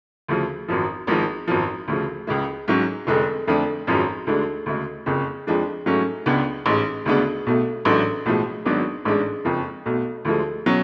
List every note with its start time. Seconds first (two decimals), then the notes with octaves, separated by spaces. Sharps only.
0.29 D2 C#3 F3
0.68 G#1 F#2 F3
1.07 G#1 G#2 F3
1.48 G#1 F#2 F3
1.88 D2 C#3 F3
2.27 C#2 C#3 G#3
2.68 G#2 F#3 C#4
3.07 F1 F2 D3 G#3
3.47 F2 D3 F3 A3 D4
3.87 G#1 F#2 F3 G#3 C#4
4.27 D2 D3 G#3 D4
4.66 D2 C#3 G#3
5.06 F#1 F2 C#3
5.47 F2 F3 G#3 D4
5.86 G#2 F#3 A3 C#4
6.26 C#2 C#3 G#3 B3 D4
6.66 A1 G#2 G#3
7.06 D2 C#3 G#3 B3 D4
7.46 B1 B2 A3
7.85 A1 G#2 F#3 A3 D4
8.25 B1 A2 F3 G#3
8.65 G#1 G#2 F#3 B3 D4
9.05 A1 G#2 G#3 D4
9.45 F#1 F2 F3
9.86 B1 B2 A3
10.25 D2 D3 F3 G#3
10.66 B2 F#3 C#4